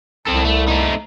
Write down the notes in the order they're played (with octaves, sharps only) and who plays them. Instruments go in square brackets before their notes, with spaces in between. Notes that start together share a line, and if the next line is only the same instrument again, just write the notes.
[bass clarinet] C2 [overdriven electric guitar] C4 A4
[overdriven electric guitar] A3
A3 D#4